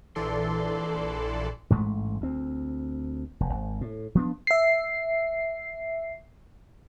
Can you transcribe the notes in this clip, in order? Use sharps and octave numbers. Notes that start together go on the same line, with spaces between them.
A#1 E3 A4 D5 C6
A1 G#2 G#3 A3
D2 C4
F1
G#1
A2
F3 B3 D4
E5 C7